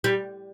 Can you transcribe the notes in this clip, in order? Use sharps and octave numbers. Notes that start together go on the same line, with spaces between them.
G3